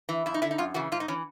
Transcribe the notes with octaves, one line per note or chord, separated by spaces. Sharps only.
E3
F2 E4
D#4
D3 E4
D#4
F#2 F4
C#3 E3 F#4
G#2 F4
D#4
E3 C#4